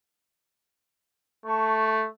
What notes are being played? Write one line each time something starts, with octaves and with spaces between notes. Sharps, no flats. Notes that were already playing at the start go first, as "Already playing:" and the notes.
A3 A5 C#6